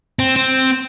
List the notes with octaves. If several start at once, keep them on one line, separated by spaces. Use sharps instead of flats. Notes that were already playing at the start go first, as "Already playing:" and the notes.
C4
C4